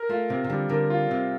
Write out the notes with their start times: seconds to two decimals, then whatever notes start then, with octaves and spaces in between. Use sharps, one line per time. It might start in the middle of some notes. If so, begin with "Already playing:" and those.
Already playing: A#4
0.09 A3 F4
0.30 C3 C4
0.44 C3
0.50 D3 G3
0.69 D3 A#4
0.90 F4
1.10 C3 C4